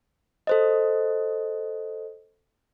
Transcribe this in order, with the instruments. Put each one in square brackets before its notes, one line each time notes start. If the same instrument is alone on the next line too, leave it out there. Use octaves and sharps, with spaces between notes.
[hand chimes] A4 C5 D#5